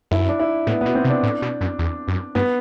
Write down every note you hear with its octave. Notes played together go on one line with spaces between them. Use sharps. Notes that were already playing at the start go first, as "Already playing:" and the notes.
F#2 E4
D4
E4
A2 B3
B2 B3
C4
C3
D4
A2
B2
F#2
E2
F#2
G2 B3